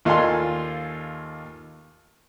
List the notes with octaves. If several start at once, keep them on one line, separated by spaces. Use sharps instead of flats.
D#2 F4 A4 D5 G#5 C6